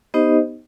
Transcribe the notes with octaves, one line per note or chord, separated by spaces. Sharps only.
B3 D#4 G4 C5 D#5